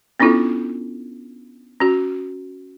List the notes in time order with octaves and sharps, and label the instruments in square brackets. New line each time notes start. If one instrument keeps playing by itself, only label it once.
[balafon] B3 C#4 D4 E4 F4 A4
C#4 F#4